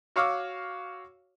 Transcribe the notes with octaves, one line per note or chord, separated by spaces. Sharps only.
F#4 C#5 F5 D6 E6 F6